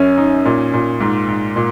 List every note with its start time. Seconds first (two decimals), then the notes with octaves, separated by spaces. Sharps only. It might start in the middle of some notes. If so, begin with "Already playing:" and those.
Already playing: F#2 C#4
0.18 D#4
0.45 A#2
0.73 A#2
1.00 G#2
1.28 G#2
1.56 A#2